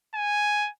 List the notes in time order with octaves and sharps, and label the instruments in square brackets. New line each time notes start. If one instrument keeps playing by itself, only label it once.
[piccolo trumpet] G#5